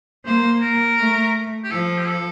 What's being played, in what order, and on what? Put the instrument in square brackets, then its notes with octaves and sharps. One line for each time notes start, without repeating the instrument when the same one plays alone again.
[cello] A#3 [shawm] C5
[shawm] A#4
[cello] A3
[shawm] G4
[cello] F3 [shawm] A4
[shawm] G4
A4